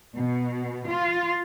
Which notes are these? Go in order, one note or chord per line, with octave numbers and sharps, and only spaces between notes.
B2
F4